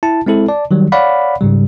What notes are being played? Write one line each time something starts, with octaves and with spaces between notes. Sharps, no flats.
E4 A5
G#3 C4 E4 A4
D5 A5
D#3 F#3 G3
C#5 D5 F5 F#5 B5
G#2 C#3 G3